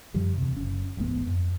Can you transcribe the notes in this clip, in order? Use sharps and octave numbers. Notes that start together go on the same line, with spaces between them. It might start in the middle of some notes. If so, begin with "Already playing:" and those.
F#2 D3 F3 G3
E2 C3
F#1 C#4
D1 A1 G#2 B3
F2